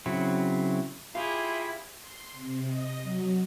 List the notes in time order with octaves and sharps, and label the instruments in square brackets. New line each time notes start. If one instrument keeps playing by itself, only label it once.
[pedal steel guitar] C#3 F#3 C4 E4
[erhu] E4 [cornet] F4 [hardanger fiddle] G4 G#4 [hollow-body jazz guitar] F5
[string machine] C6
C3
D#5
F#3